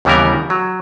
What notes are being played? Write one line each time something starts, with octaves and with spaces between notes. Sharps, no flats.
D#2 C#3 E3 G3 B3 A#4
F#3